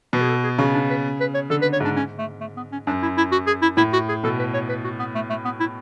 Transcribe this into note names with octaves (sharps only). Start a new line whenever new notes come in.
B2 B4
G#4
A4
G#4
C#3 F#4
D4
B4
B4
C#5
D3 A4
B4
C#5
G#2 D4
C#4
A3
A3
B3
C#4
F#2 D4
E4
E4
F#4
G#4
E4
A2 E4
F#4
G#4
B2 A4
B4
C#5
B4
F#4
B3
A3
A3
B3
E4